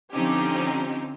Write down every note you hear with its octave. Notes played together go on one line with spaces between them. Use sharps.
D3 F3 C4 C#4 D#4 G4